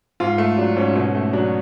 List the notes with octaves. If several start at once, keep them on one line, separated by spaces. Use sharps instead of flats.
G#2 F4
A3
F#3 D4
G#2 C#4
B2 C#4
A3
F#3 D4